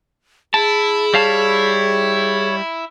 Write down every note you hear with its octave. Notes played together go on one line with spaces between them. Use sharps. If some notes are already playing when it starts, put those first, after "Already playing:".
E4 G#4 A5
G3 C#5 F5 A5